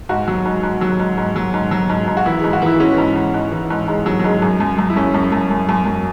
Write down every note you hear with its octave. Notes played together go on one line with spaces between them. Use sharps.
G#2 F#4
F#3
G#2
G#2
F#3
G#2
G#2
F#3
G#2
F#3
G#2
G#2
F#4
E3 E4
G#2 G#4
F#4
E3 E4
E3 C#4
G#2
G#2
G#2
E3
G#2
G#2 G#3
G#2 F#3
F#3
G#2 G#3
F#2
F#2
F#2
E4
F#2 C#4
F#2
F#2
F#2
F#2
F#2